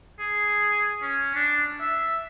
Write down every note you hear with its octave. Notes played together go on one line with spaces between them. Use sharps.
G#4
C#4
D4
E5